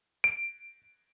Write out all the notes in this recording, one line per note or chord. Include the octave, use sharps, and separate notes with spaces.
D7